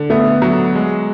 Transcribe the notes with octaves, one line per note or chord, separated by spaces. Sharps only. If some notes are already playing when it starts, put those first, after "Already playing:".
Already playing: D3
A3 B3
F#3
G#3